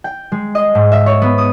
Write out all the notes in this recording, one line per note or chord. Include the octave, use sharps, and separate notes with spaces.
G5
G#3
D#5
G#2
E5
C#5
B3
D#6